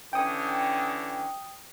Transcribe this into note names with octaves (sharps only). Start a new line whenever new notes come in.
D3 E3 C#4 G5 D#6